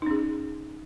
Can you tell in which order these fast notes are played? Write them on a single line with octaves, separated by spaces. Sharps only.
D#4 C#4 G#4